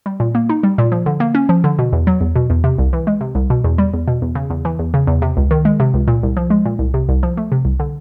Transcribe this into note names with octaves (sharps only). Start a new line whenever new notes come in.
G3
A#2
A#3
D#4
G3
A#2
F3
D3
A#3
C#4
F3
D3
B2
E2
F#3
E2
B2
E2
C3
C2
E3
G#3
C3
C2
B2
E2
G3
E2
B2
E2
C#3
E2
E3
E2
C#3
E2
C3
C#2
D#3
G#3
C3
C#2
A#2
C2
F3
G#3
A#2
C2
C3
C2
F3
A3
C3
C2
D3